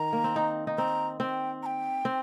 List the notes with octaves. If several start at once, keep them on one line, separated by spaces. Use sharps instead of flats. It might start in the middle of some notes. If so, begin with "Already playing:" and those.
Already playing: D#3 A#5
A#3
C4
D#4
D#4
C4 A#5
C4 G5
A#5
G5
C4